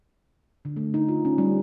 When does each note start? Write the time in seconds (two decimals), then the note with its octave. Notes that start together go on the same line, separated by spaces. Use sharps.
0.65 D3
0.76 A3
0.94 D#4
1.09 F4
1.25 C#4
1.38 G3